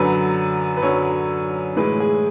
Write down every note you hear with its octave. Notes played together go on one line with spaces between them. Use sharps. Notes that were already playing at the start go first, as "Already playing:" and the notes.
Already playing: F#2 D3 F#3 B4
B4
F#2 D3 F#3 C#5
A2 E3 G#3 B4
G#4